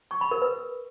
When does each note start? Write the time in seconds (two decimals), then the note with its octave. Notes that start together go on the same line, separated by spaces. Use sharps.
0.11 C#6
0.21 B5
0.31 A#4
0.42 B4